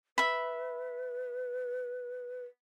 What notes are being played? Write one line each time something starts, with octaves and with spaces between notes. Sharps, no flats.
B4 E5 B5